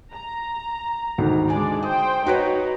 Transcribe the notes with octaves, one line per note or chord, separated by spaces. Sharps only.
A#5
D2 G#2 D#3
G#3 D4 D5 G#5
C5 G5 D#6
D#4 F#4 B4 C#5